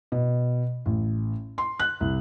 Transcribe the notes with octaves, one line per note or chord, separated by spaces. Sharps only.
B2
A1
C6
F#6
C2